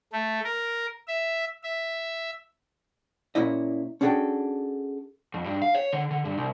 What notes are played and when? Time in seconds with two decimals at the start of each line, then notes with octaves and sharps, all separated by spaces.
0.13 A3
0.44 A#4
1.07 E5
1.63 E5
3.35 A#2 A#3 C#4 E4 D#5
4.01 C#4 D4 F#4 G#4 A4 G5
5.34 F2
5.45 G2
5.62 F5
5.75 C#5
5.93 D3
6.11 D3
6.25 G2
6.38 C2